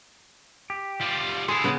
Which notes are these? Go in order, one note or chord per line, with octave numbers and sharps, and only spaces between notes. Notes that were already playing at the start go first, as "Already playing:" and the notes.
G4
G3 F4
D3 E4 G#4 C6
C#3 B3